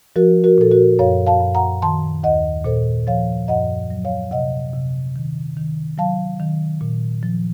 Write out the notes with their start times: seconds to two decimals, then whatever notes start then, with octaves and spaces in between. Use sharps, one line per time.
0.16 F3 F#4 A#4
0.44 F#4 A#4
0.58 A#2 A4
0.71 F#4 A#4
0.99 F#2 C#5 F5
1.27 F5 A5
1.40 F#2
1.55 F#5 A#5
1.82 D#3 A5 C6
2.23 D#2 D#5 F#5
2.65 A#2 A4 C5
3.07 F3 C#5 F5
3.48 F#2 D#5 F#5
3.90 F#3
4.05 C#5 F5
4.31 C3 D#5 F#5
4.74 C3
5.16 D#3
5.57 D#3
5.98 F#3 F5 A5
6.40 D#3
6.81 A#2
7.23 F3